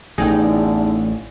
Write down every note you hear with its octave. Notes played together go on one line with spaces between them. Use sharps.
A1 E2 D3 D#4 G#4 D5 G5